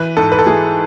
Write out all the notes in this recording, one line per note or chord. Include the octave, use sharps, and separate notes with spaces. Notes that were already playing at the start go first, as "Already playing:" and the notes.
Already playing: E3 B4
G#2 A4
B4
A4
E3 G#4